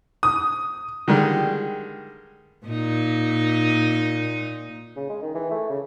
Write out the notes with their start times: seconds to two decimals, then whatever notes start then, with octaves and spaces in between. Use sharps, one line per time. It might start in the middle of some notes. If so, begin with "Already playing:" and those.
0.23 D#6
1.08 D3 D#3 G3 G#3
2.67 A#2 D#4
4.96 C#3
5.10 G#3
5.22 D#3
5.35 E3
5.51 A3
5.69 C#3